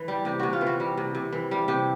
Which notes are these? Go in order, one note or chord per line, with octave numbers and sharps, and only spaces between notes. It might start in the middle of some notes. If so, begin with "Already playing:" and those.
Already playing: E3
G3
C3 G4
C3 F#4
F4
E3
F#4
G3
C3
C3
E3
G3
C3 G4